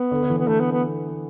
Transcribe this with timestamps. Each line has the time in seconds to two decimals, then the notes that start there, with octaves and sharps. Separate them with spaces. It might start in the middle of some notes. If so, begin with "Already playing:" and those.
Already playing: B3
0.11 D3
0.23 D3
0.30 E3
0.38 B3
0.47 D3 A3
0.60 B3
0.72 B3